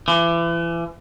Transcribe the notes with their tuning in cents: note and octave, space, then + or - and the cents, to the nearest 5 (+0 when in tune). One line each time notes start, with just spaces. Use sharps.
E3 +35